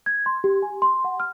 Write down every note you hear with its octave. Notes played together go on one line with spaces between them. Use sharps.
G#6
C6
G4
G#5
C6
F#5
F6